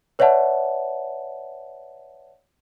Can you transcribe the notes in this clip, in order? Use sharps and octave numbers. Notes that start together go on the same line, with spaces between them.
B4 C#5 D5 E5 F#5 A5